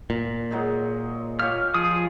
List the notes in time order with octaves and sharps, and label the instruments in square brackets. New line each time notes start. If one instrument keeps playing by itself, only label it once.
[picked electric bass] A#2
[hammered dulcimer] F#3 G#3 D#4
[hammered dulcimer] F4 G4 C#5 [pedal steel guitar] F6
[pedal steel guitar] F3 G#4 D#6